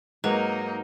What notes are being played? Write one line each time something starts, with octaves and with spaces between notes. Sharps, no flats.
G#2 F#3 A#3 D#4 A#4 B4